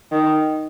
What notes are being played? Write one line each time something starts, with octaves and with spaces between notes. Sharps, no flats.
D#3